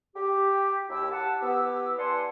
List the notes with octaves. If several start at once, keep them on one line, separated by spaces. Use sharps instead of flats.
G4
D#2 E4 G4 E6
F#5 A5
B3 E4 G4 E6
B4 D5 F#5 G#5 A5 C6